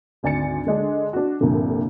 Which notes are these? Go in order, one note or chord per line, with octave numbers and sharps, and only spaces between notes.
G#1 D2 D5 G#5 A6 C#7
D3 G#3 D4
D4 F#4
C2 G2 A#2 D3 F3